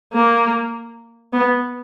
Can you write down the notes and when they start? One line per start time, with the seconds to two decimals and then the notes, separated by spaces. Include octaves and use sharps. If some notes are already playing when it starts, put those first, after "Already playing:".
0.13 A#3
1.33 B3